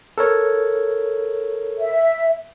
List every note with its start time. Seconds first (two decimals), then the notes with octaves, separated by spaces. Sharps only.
0.18 A4 A#4 C#5
1.79 E5